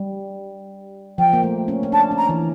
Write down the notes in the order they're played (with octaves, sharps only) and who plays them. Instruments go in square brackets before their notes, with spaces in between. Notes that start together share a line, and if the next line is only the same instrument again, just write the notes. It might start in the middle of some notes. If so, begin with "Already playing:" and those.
Already playing: [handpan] G3
[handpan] F3 [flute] G5
[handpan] A#3
A3
C#4
C#4
[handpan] D4 [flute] A5
[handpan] C#4
[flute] A#5
[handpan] E3